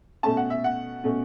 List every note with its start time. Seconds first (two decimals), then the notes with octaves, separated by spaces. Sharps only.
0.23 B2 A3 C#4 A5
0.37 F#5
0.50 E5
0.64 F#5
1.04 B2 A3 C#4